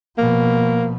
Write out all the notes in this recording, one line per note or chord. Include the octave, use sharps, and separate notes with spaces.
B2 F3 A#3